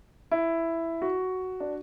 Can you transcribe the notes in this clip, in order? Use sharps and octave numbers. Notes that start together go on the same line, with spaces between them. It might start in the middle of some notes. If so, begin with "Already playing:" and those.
E4
F#4
D4